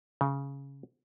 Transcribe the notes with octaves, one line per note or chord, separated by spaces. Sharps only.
C#3